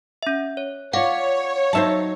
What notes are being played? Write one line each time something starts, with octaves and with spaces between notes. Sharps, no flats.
C#4 E5
C#5
F4 C#5 D5 F5 F#5
F#3 D#4 C5 E5 A5